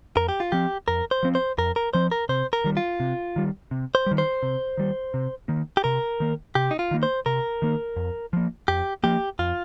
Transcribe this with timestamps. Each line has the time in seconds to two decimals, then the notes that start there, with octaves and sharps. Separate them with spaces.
0.16 F2 A#4
0.29 G4
0.40 F4
0.52 F3 C4 G4
0.88 F2 A#4
1.11 C5
1.23 F3 C4
1.35 C5
1.58 F2 A#4
1.76 A#4
1.93 F3 C4 C5
2.11 A#4
2.29 C3 C5
2.53 A#4
2.64 D#3 G3
2.77 F4
3.00 C3
3.36 D#3 G3
3.71 C3
3.95 C5
4.06 D#3 G3
4.18 C5
4.43 C3
4.77 D#3 G3
5.14 C3
5.48 D#3 A#3
5.77 G4
5.84 C3 A#4
6.20 D#3 A#3
6.55 C3 G4
6.71 D#4
6.79 F4
6.91 D#3 A#3
7.03 C5
7.26 C3 A#4
7.62 D#3 A#3
7.96 F2
8.33 F3 A#3
8.68 F2 G4
9.03 F3 A#3 G4
9.39 F2 F4